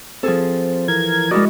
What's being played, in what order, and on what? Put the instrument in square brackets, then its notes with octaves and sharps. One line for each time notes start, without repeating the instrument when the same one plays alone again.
[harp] F3 G#4 A4 [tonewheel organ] C4
[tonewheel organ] E3 A#4 G#6
[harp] G#3 E4 F#4 [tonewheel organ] A#4 D5 D#5